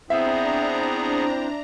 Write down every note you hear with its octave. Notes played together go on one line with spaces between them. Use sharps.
B3 C4 D4 E4 G#4 C5 E5 A#5